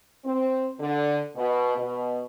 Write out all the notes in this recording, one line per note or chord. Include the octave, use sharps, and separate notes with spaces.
C4
D3
B2
B2